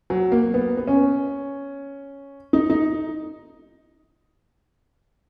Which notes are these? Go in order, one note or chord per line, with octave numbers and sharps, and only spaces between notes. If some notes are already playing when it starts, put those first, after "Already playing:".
F#3
A#3
B3
B3
C#4
D#4
D#4